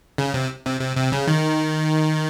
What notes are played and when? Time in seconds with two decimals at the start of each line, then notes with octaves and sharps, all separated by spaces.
0.18 C#3
0.34 C3
0.66 C3
0.81 C3
0.97 C3
1.12 C#3
1.27 D#3